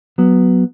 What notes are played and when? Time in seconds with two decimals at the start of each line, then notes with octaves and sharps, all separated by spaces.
0.18 F#3 B3